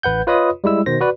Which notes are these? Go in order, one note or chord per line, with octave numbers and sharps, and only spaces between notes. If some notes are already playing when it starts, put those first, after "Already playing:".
A1 B4 F#5 G6
F4 B4 C#5 D#5 B5 D#6
G3 G#3 E4 E6
B2 D#3 C5 A#6
F#4 B4 D5